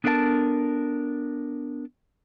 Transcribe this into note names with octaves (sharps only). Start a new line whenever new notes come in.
B3 D4 A4 A#4 E5 A5